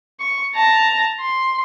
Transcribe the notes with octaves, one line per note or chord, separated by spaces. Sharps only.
C#6
A5 A#5
C6